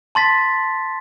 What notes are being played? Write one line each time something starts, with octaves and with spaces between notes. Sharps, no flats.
A5 C6 A6 B6